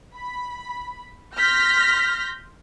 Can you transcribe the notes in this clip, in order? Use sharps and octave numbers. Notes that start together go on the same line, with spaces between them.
B5
C6 F6 G6 A#6 B6